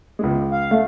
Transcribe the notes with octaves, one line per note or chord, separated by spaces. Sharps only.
C#2 G#3
F5
A3